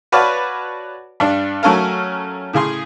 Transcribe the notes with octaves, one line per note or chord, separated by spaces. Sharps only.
F#4 B4 C#5 D5 F5 A5
G2 D4
F#3 A3 C#4 A4 A#4 F5
A2 C#3 G#4 C6